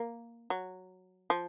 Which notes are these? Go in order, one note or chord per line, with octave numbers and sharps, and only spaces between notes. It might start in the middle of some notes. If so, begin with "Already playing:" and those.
Already playing: A#3
F#3
F3